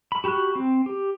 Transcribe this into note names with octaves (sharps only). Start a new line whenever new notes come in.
B5
F#4 G4 B5 C#6 F#6
C4
G4